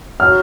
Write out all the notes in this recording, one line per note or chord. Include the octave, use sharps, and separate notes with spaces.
F#3 F6